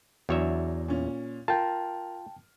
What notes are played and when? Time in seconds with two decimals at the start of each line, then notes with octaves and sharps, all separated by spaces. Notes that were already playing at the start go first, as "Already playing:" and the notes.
0.29 E2 F#3 D4 C#5 E5
0.88 A#2 C#4
1.48 F4 A#4 G5 A5